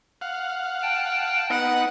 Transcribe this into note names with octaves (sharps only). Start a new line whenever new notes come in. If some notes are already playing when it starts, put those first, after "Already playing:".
F5 F#5
G5 A5
B3 D#4 F#5